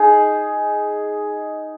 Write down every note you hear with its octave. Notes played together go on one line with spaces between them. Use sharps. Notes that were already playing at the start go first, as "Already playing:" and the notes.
Already playing: D#4 G#4 D#5